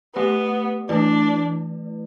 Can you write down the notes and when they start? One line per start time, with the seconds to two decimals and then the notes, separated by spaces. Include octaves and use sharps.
0.15 A3 B3 G4 B4
0.89 E3 A3 D4 E4 B4 D5